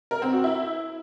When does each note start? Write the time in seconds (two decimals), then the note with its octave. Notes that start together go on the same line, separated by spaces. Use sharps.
0.11 A#4
0.22 C4
0.33 F#4
0.44 E4